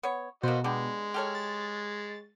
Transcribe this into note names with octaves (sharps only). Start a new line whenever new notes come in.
B3 C#5
B2 A#3 F#4 C5 D#5
G#3 B3 D4 G4
G4 A4 C#5 F6
A6